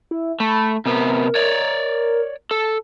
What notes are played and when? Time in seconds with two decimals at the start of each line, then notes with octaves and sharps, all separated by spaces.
0.11 E4
0.40 A3 B5
0.86 C3 B3 A#4
1.35 C#5 D5
2.51 A4